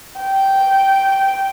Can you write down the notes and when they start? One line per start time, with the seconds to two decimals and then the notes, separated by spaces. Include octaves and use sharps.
0.22 G5